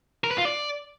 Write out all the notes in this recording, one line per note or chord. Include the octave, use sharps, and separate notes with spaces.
A#4
B4
F4
D5